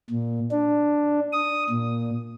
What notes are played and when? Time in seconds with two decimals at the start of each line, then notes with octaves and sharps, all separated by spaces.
0.10 A#2
0.51 D4
1.33 D#6
1.70 A#2